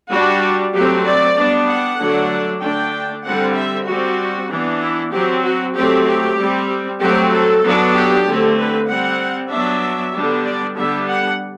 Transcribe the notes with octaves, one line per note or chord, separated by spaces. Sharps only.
G3 D4 F#4
F#3 A3 C4 G4
D5
G3 B3 D4
F#5
D3 F#3 A3 D4
D3 A3 D4 G5
D3 G3 C4 F#5
E5
G3 C4 F#4
E3 B3 D4
E4
F#3 C4 G4
F#4
F#3 A3 C4 G4
G4
G3 C4
F#3 A3 C4 G4
A4
F#3 B3 D4
G4
D3 A3 C4
B4
G3 C4 F#5
F#3 B3 D4 E5
D3 G3 B3 D4
D5
D3 G3 B3 D4 E5
F#5